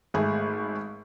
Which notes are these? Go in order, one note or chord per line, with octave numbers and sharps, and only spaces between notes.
G#1 A3 G#4